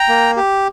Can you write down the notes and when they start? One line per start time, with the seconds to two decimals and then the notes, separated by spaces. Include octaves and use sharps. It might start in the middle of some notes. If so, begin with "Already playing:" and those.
Already playing: G5 A#5
0.08 A#3
0.36 G4